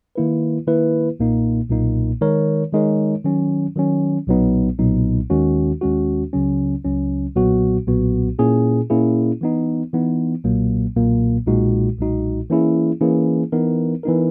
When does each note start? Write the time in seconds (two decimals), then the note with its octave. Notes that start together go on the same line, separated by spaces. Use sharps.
0.15 D#3 A#3 E4 B4
0.67 D#3 A#3 E4 B4
1.19 B1 A#2 A#3 D#4
1.70 B1 A#2 A#3 D#4
2.21 D#3 G#3 D#4 A#4 C#5
2.73 D#3 G#3 D#4 A#4 C#5
3.25 D#3 F#3 C#4
3.76 D#3 F#3 C#4
4.27 B1 A#2 F#3 B3 D#4
4.79 B1 A#2 F#3 B3 D#4
5.30 D#2 D#3 G#3 C#4 F#4
5.81 D#2 D#3 G#3 C#4 F#4
6.33 C#2 C#3 F#3 C#4
6.85 C#2 C#3 F#3 C#4
7.35 B1 A#2 F#3 B3 F#4
7.87 B1 A#2 F#3 B3 F#4
8.39 A#2 A#3 C#4 E4 G#4
8.90 A#2 A#3 C#4 E4 G#4
9.41 E3 B3 D#4
9.93 E3 B3 D#4
10.44 B1 A#2 F#3 A#3
10.96 B1 A#2 F#3 A#3
11.47 B1 A#2 G#3 D#4 F#4
11.98 B1 A#2 G#3 D#4 F#4
12.50 E3 A#3 C#4 E4 G#4
13.01 E3 A#3 C#4 E4 G#4
13.52 E3 B3 D#4 A#4
14.03 E3 B3 D#4 A#4